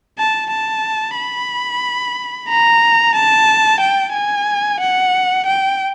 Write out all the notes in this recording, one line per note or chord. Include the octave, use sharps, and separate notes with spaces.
A5
A5
B5
A#5
A5
G5
G#5
F#5
G5